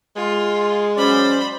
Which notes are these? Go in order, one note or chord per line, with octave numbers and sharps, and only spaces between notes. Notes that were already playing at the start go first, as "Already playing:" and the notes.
G#3 F4
F#3 C#4 C5 D5 B5